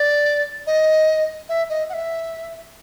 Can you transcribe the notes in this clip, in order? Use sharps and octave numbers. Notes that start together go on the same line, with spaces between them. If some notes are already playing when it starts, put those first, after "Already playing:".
Already playing: D5
D#5
E5
D#5
F#5
E5